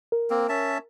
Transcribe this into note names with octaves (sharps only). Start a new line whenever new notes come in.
A#4
A#3 C4
C#4 E5 A5